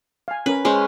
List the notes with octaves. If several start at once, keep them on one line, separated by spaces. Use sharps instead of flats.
F5 G#5
C#4 A#4 B4
G#3 C#4 C5